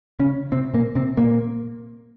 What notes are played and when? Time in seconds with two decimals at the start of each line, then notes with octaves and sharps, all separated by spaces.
0.19 C#3 C#4
0.52 C3 C4
0.74 A#2 A#3
0.95 C3 C4
1.17 A#2 A#3